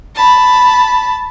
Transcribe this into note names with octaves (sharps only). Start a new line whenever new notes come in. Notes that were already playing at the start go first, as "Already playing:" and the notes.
A5 B5